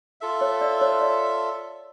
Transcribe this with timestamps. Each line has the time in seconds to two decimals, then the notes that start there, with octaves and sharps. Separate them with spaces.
0.21 F4 A4 E5
0.41 C#5
0.61 D5
0.81 C#5
1.01 D5